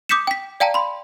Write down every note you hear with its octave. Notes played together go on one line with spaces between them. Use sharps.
D6 D#6 G6 B6 C#7 E7
G5 B6
D5 F5 G5 A5 A#5
B5 C6